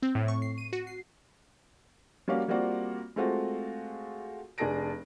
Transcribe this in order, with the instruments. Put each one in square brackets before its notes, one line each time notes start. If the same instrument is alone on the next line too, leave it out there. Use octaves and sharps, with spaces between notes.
[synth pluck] C4
A2
C#6
C7
D#7
F#4
C7
[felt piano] G3 A#3 C#4 F#4 D5 F5
G3 A#3 C4 F4 F#4 D5
G#3 A3 C4 F4 F#4
F1 D4 G#4 A5 A#6 D7